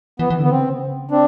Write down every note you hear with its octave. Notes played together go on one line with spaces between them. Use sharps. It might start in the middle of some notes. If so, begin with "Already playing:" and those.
E3 B3
E3
D3 B3
C#3 C4
C4 D4